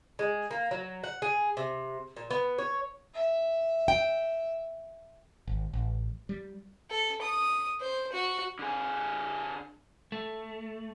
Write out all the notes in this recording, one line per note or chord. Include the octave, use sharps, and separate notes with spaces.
G#3
A#3
F#3
F#5
G#4
C3
A#2
B3
C#5
E5
G5
G#1
A1
G3
A4
D#6
C5
F#4
D3 G#4
A3